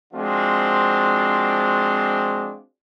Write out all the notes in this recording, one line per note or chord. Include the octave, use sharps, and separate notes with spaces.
F3 G#3 C4 D4 F4 F#4